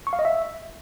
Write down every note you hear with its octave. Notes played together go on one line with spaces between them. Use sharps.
C#6
F5
D#5
E5